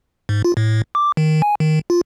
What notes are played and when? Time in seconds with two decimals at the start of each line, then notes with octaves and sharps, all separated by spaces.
0.29 G#2
0.45 F4
0.57 A2
0.95 D6
1.17 D#3
1.42 G#5
1.60 D#3
1.90 F4